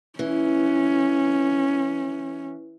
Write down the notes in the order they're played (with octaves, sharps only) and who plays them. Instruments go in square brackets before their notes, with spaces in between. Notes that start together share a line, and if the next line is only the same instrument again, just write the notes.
[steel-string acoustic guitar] E3 [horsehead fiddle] C#4